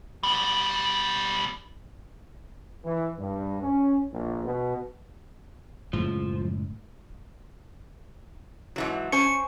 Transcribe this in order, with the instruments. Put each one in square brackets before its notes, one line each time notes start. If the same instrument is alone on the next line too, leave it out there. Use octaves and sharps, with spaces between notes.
[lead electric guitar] B2 G3
[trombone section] E3
G2
C#4
A#1
B2
[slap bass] F#1 A2 G#3 [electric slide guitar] F3
[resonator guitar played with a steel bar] G#2 E3 F#3
[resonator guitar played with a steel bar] C#4 C5 G#5 [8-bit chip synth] C#7